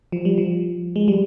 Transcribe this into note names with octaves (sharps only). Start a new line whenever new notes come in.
F3
G3
F3
G#3
G3